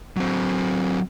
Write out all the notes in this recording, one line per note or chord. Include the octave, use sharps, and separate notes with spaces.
F#3 C4